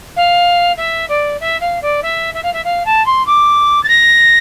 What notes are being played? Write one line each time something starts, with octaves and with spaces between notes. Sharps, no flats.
F5
E5
D5
E5
F5
D5
E5
E5
F5
E5
F5
A5
C6
D6
A6
A#6